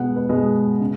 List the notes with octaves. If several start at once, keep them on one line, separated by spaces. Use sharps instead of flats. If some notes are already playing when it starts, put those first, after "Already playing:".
Already playing: B2 G#3 B3 F#5
B4
B2 G#3 B3
C#3